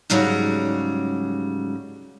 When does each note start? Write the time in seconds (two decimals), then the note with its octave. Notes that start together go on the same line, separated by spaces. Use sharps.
0.10 G#2 C#3 F#3 G3